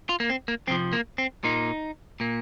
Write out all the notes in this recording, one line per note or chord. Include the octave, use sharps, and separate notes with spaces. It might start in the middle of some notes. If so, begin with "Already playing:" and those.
F4
A#3
C4
A#3
F2 C3 F3 C4
A#3
C4
A#2 A#3 D#4
A#2 A#3